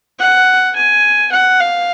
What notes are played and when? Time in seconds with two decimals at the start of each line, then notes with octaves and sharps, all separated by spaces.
0.19 F#5
0.76 G#5
1.32 F#5
1.60 F5